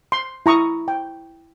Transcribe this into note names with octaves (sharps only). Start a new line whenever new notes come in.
C6
E4 A#5 C#6 D#6
G5